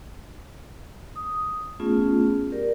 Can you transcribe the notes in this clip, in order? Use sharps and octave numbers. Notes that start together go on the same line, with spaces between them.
D#6
A3 B3 C#4 F4 G#4
G4 A#4 D5